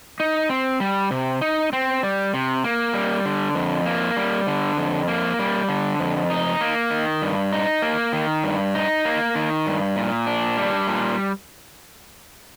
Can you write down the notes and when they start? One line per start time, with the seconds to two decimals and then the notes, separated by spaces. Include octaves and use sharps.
0.20 D#4
0.49 C4
0.80 G3
1.11 C3
1.41 D#4
1.73 C4
2.03 G3
2.34 C3
2.64 A#3
2.94 G3
3.25 D3
3.55 F2
3.86 A#3
4.17 G3
4.47 D3
4.77 F2
5.08 A#3
5.39 G3
5.69 D3
5.99 F2
6.30 D#4
6.61 A#3
6.91 D#3
7.22 G2
7.52 D#4
7.82 A#3
8.13 D#3
8.44 G2
8.75 D#4
9.05 A#3
9.35 D#3
9.67 G2
9.96 A#2
10.27 D4
10.57 G3
10.88 A#2